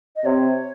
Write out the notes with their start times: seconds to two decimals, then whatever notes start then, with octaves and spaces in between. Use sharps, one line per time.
0.16 D#5
0.25 C3 C#5